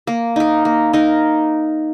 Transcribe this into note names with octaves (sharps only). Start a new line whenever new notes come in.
A#3
D#4 A#4
A#3
D#4 A#4